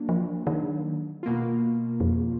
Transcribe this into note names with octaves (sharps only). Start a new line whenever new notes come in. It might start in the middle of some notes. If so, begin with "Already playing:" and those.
Already playing: F#3 A#3 D4
F3
D#3
B2 A#3 F4
F2